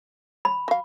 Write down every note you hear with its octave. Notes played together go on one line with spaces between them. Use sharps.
B5
F#3 F5